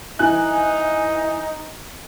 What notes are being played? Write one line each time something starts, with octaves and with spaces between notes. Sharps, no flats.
E3 D#4 G#5 F#6